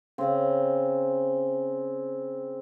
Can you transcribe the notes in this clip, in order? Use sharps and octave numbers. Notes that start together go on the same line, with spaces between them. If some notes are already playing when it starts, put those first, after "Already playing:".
C#3 C4